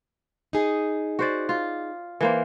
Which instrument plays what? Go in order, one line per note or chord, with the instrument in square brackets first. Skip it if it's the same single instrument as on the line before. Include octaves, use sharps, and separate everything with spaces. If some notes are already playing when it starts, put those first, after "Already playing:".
[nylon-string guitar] D#4 G#4
[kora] F#4 C5 D5
F4
E3 A#3 C5